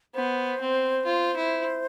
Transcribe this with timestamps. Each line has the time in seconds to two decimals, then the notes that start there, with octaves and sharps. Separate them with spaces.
0.14 B3 C5
0.61 C4
1.06 F4
1.36 E4